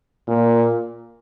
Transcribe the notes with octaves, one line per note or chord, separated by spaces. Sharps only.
A#2